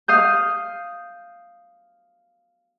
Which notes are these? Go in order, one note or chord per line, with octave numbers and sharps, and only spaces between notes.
F5 D#6 G6